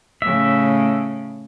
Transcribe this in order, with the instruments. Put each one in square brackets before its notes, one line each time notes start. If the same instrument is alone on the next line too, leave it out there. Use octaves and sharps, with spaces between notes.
[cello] A2 C#3 [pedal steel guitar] E5